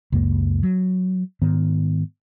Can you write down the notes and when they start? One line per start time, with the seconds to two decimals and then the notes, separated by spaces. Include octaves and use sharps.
0.12 C#2 F#2 A#3
0.63 F#3
1.42 G#2 D#3 B3